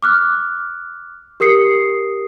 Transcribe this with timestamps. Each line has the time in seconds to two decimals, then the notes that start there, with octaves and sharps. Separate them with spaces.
0.02 D6 F6 F#6
1.40 G4 A#4 D#6 C7 C#7